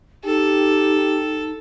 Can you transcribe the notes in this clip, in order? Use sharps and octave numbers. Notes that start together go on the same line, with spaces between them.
D#4 G4 A4